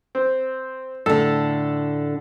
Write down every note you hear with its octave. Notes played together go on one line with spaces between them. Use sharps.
C4
A2 D3 A4